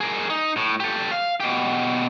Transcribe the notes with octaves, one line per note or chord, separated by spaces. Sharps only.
G#4 A#4
D#4
A2
G4 A4
F5
B2 G4